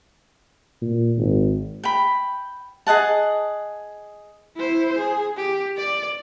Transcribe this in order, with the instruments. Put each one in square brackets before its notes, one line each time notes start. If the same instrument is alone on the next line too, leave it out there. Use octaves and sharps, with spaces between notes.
[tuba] A#2
G#1
[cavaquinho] G5 B5
G#4 D#5 F#5 A5
[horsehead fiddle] E4 C5
G#4
G4
D5